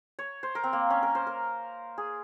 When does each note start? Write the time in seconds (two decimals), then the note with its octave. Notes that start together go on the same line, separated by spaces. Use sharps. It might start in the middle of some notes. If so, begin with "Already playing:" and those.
0.19 C#5
0.43 C5
0.55 A#4
0.64 C4
0.73 A#3
0.90 C#4
1.03 A#4
1.15 C5
1.27 A#4
1.98 G#4